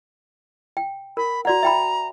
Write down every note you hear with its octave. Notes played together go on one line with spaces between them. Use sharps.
G5
A#4 B5
F#4 D5 F#5 A#5
E5 G5 B5